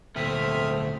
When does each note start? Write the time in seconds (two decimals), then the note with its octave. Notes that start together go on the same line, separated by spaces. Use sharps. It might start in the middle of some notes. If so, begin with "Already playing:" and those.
0.16 D2 A#2 A3 C4 E5 D#6 F6